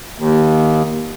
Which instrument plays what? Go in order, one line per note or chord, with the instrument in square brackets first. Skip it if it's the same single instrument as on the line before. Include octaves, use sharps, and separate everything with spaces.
[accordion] D#2